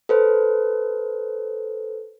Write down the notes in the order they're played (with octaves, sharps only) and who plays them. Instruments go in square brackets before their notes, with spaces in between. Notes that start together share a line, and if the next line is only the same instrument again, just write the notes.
[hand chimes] A4 B4 C5